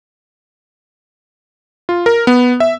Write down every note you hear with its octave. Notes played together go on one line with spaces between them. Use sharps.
F4
A#4
B3
E5